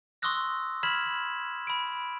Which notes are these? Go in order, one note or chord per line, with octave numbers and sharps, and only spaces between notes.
C6 C#6 D#6 E6 F#6 A#6
B5 F6 G#6 B6 E7 F#7
B5 D7